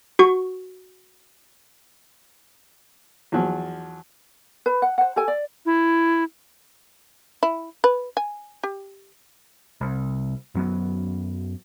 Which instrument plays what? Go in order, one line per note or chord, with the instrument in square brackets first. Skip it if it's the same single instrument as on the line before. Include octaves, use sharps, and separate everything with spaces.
[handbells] F#4 C#6
[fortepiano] E2 F3 F#3
[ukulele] B4
F#5
C5 F#5
G4 A4 G#5
D5
[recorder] E4
[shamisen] E4
B4
G#5
G4
[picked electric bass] C2
F#2 F#3 B3